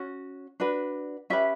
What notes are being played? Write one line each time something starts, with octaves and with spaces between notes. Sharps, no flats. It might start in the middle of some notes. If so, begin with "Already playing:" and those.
Already playing: C#4 F#4
D4 F#4 B4
C#4 G4 B4 E5